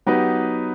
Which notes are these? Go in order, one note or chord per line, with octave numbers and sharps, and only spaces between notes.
F#3 B3 D#4 G4 B4